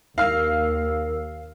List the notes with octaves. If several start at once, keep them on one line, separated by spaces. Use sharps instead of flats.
D#2 A#4 F5 E6 F6